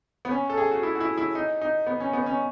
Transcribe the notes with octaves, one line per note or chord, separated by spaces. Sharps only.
B3
C#4
A4
G#4
F#4
E4
F#4
E4
E4
D#4
D#4
B3
C#4
B3
C#4